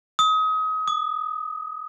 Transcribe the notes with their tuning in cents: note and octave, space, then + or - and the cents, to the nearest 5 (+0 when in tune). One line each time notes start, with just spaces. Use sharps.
D#6 +30
D#6 -30